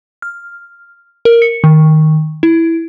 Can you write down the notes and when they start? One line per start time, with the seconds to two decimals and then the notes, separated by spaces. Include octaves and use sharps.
0.22 F6
1.25 A#4
1.42 C#7
1.64 D#3
2.43 E4